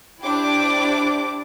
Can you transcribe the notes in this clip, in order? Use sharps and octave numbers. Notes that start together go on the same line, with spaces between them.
D4 E4 G4 C5 D6